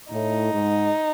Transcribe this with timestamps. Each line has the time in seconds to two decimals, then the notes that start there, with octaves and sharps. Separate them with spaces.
0.12 A2 D#4
0.52 G#2